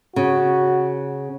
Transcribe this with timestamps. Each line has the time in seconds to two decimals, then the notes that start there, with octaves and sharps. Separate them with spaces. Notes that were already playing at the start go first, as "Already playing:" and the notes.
0.16 C#3 F#4